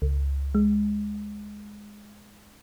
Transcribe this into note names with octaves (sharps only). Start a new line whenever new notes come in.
C#2
G#3